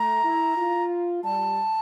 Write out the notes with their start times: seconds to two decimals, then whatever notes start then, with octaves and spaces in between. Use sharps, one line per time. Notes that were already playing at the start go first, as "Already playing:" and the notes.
Already playing: A3 A#5
0.24 E4
0.57 F4
1.24 G3 A5